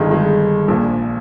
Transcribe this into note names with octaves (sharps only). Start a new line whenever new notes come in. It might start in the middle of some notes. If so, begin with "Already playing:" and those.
Already playing: G1 G2 D#3 G#3
G#3
A#1 A#2 F3